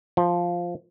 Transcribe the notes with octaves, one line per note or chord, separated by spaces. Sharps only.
F3